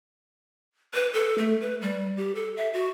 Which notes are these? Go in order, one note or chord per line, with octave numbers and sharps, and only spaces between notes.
B4
A4
A3
B4
G3
G4
A4
E5
F#4